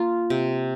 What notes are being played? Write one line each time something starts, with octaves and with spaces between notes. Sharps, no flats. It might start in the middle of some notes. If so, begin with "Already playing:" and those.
Already playing: A#3 F4
C3